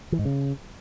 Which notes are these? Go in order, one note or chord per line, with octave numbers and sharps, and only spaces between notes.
E3
G#2
C#3